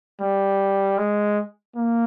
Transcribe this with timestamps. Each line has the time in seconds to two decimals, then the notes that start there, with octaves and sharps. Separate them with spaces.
0.21 G3
0.98 G#3
1.76 A#3